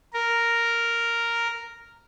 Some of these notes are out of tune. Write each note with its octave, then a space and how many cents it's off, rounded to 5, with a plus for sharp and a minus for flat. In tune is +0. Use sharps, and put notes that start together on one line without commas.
A#4 -5